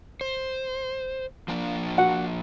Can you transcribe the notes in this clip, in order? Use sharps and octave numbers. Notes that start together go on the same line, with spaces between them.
C5
F3 A#3 D4
F#4 F#5